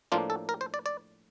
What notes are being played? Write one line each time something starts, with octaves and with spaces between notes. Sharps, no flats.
A2 F3 A#3 D4 F4
A4
A#4
C5
D5
D5